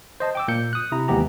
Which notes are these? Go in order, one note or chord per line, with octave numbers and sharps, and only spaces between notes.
C5 D#5 A5
G5 D6 E6
A#2 A#3 G6 C#7
D#6 F#6
C3 E4 A#5
D#2 E3 G#3 B3 G4 A#5